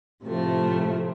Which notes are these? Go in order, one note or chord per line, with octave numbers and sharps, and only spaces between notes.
A2 C3 F3 A3